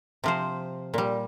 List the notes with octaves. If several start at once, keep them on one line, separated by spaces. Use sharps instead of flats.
C3 F3 C5
A#2 G3